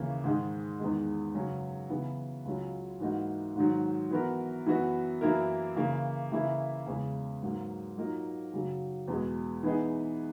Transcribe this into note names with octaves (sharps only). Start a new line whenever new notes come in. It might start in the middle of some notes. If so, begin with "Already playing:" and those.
Already playing: D#2 C#3 E3 A#3 C#4
G#2 D#3 G#3
E2 D#3 G#3
F#2 C#3 F#3 C#4
C#3 E3 B3
C#2 C#3 F#3 C#4
G#2 E3 A#3 D#4 F#4
G#2 D#3 F#3
E3 B3 F#4 A#4
F#2 E3 B3 F#4
F#2 E3 A#3 E4 A#4
C#3 E3 A#3
C#3 E3 A#3 E4
E2 C#3 G#3 C#4
G#2 F#3 A#3
A#2 F#3 A#3 D#4 A#4
F#2 C#3 F#3
E2 B2 G#3
E3 B3 D#4 G#4